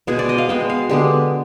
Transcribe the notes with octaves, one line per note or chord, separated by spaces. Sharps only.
B2 G#3 B3 G#4
D5
D#5
F5
B2 G#3 B3 G5
F5
D3 G#3 B3 G4